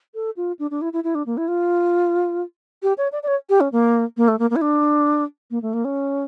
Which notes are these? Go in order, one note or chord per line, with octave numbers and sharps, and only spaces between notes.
A4
F4
D4
D4
E4
E4
E4
D4
A#3
E4
F4
G4
C#5
D5
D5
C#5
G4
C#4
A#3
A#3
A3
A#3
A#3
E4
D4
A#3
A3
A#3
C#4